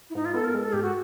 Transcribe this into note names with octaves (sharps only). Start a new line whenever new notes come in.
E4
G#2 D#4
F4
B3 A4
A#4
G#3
A4
G#2 G4
F#4